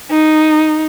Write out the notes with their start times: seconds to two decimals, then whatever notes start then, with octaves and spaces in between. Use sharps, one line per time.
0.10 D#4